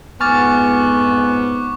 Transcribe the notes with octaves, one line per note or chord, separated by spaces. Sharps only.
F2 G#2 B3 G#5 C#6 D6 F6 A6